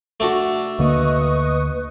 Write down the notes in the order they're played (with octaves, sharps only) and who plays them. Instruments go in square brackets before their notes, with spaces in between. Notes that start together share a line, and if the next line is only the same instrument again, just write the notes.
[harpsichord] A3 D4 F#4
[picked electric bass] D2 D3 A#3 [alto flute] B4 [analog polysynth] D#5 C#6 D#6